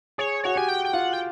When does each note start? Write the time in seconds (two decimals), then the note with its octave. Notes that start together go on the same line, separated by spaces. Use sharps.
0.18 G#4 C#5
0.44 F#4 C#5
0.56 G4 G#5
0.69 G5
0.85 G5
0.93 F4 F#5
1.13 G5